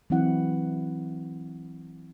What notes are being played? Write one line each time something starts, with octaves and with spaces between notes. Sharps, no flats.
E3 F#3 C4 E4 F#5